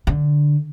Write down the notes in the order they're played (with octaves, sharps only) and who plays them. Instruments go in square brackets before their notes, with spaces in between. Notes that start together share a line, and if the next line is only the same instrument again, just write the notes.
[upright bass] D3